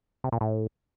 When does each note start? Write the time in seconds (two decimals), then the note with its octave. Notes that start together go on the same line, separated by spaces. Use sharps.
0.24 C3
0.32 A#2
0.41 A2